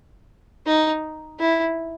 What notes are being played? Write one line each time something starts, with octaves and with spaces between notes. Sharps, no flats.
D#4
E4